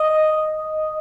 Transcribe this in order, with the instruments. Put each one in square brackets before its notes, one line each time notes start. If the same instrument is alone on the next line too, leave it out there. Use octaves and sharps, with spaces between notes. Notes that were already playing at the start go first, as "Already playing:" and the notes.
Already playing: [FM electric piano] D#5